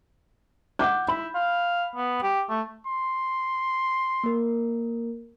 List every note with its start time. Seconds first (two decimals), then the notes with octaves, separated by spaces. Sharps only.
0.79 F#5 D6 G6
1.08 E4 B5
1.35 F5
1.95 B3
2.23 G4
2.50 A3
2.87 C6
4.24 A#3 A#4